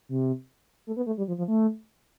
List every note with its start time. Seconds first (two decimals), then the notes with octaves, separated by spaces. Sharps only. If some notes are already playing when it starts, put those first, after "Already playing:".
0.09 C3
0.87 A3
0.96 B3
1.06 A3
1.18 G3
1.28 F3
1.38 F3
1.48 A3